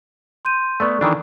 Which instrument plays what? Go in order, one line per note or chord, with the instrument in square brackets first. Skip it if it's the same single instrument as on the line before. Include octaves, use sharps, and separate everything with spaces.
[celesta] C6 G6 D#7
[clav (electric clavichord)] A3 B3 [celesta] A4 D5 C#6
[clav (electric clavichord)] D#3 E3 D4